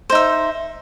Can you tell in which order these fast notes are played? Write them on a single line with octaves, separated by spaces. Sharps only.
C5 D#4 E5